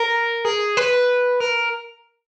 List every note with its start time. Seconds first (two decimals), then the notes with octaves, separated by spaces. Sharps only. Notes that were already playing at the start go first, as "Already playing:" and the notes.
Already playing: A#4
0.45 G#4
0.77 B4
1.40 A#4